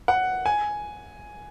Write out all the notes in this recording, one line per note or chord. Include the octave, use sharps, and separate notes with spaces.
F#5
G#5